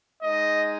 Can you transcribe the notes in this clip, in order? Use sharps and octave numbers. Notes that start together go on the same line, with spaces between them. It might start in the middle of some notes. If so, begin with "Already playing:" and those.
G#3 D#4 D#5